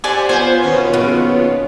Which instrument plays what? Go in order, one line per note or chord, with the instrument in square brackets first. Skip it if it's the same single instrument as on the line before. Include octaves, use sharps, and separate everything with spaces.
[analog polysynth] G4 C5 F#5 [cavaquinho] D5 G#5
[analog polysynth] B3 F4 [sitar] C5 [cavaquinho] G#5
[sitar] D#2 B2 C#4
[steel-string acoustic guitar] F#2 C#3